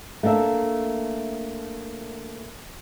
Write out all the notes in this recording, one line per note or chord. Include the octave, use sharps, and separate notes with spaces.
A3 A#3 D4 E5